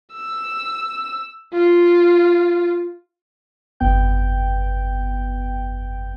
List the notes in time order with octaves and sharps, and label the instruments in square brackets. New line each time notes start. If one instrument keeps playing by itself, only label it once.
[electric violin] E6
F4
[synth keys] G1 F2 B3 G5 G6